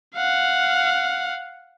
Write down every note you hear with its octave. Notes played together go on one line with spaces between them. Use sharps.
F5 F#5